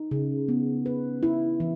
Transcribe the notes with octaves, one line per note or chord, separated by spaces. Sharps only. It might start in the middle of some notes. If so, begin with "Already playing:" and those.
Already playing: D#4
C#3
B3
B4
E4
E3